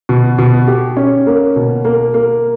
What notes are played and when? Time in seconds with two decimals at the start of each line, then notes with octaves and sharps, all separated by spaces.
0.09 B2
0.38 B2
0.68 G4
0.97 C#4
1.27 A#3
1.56 B2
1.85 A#3
2.14 A#3